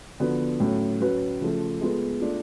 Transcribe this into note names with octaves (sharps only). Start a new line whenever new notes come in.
D3 F3 B3 F#4
A2 F#3 C#4
F#3 C#4 F#4 B4
C#3 F3 A3 F4
G#3 B3 F4 A4
A3 D4 F4